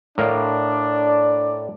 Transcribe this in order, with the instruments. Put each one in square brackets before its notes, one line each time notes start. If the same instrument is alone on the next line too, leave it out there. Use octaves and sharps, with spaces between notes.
[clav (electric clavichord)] A2 A#4 F5 [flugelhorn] D4 [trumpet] D5